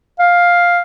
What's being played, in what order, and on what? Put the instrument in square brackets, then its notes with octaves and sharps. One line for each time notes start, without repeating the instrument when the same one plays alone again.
[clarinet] F5